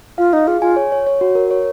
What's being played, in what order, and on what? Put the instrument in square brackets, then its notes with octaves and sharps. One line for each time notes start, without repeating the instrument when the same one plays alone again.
[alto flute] F4 [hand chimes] F5
[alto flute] D#4 [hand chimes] F5
[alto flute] F4 [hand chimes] G#4
[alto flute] F4 [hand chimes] G#5
[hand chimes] C#5
C#5
C#5
F#4
A#4
C#5